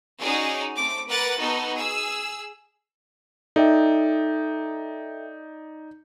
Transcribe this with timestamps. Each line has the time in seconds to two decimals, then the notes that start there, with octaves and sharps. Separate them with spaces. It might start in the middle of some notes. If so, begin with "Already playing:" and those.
0.20 C#4 D#4 F#4 G#4 D5
0.75 A3 C4 D6
1.08 A#4 B4 F#5 D6 F#6 A6
1.38 B3 D#4 F#4 A4
1.73 G#4 E6
3.56 D#4 A4 D5 E5 G5